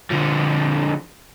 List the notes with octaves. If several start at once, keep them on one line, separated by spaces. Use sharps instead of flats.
D3 F3